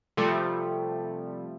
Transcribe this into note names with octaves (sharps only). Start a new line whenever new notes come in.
C3 F3 G3 A3